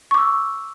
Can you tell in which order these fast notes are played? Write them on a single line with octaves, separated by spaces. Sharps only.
C#6 D6 E6